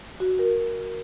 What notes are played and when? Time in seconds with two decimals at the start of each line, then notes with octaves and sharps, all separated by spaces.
0.20 F#4
0.39 A#4